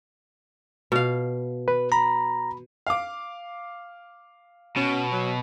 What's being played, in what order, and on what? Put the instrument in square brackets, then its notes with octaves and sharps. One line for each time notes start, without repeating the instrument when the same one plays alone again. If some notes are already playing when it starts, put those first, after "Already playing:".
[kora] B2 F5
[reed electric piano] B4
[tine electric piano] A#5 [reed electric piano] B5
[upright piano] F5 D6
[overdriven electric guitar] B2 [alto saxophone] C#4
[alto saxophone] F#3